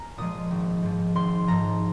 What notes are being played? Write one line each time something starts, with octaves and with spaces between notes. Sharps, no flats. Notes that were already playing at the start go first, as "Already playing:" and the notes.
Already playing: G#5 A#5 F6
A#2 F3 G#3 D#6
G#1
G#2 F3
G#1 C6
G#2 F3 A#5